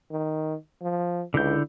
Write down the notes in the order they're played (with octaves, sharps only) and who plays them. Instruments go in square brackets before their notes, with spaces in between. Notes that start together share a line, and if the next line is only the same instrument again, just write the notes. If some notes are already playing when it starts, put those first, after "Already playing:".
[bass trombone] D#3
F3
[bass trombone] C#2 [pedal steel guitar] D3 E4 G6